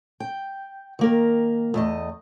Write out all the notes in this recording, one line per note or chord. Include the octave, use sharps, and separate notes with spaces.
G5
D#3 A#3 A#4
E2 A3 D#5